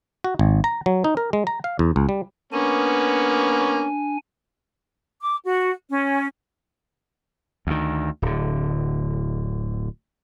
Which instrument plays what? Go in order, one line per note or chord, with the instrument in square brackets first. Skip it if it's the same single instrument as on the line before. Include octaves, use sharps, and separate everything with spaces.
[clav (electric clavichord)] F#4
G#1
A#5
F#3
D#4
A#4
G#3
A#5
F5
E2
C#2
G3
[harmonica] A#3 B3 C#4 [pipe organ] D4 G#5
[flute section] D6
F#4
C#4
[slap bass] D2 D#3
D1 D3